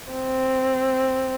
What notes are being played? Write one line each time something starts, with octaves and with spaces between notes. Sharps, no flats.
C4